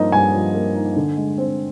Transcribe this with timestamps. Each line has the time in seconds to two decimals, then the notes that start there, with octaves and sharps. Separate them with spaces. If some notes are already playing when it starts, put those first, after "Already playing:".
Already playing: G2 F3 A#3 D#4 D#5
0.12 G2 G#5
0.33 F3
0.55 A#3
0.75 D#4
0.96 D3
1.17 G#3
1.38 C4